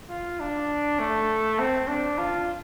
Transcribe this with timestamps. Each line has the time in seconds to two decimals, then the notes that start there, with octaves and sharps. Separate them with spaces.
0.09 F4
0.40 D4
1.00 A3
1.59 C4
1.88 D4
2.18 F4